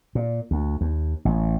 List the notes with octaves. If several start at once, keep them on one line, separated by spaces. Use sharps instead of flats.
A#2
D2
D#2
A1